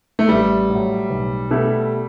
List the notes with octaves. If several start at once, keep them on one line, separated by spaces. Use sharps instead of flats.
A3
A1 G3
A2 F#3
B1
B2 A3 E4 G4